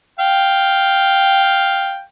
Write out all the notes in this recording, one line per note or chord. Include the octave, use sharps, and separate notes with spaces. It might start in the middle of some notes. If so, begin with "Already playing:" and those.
F5 G5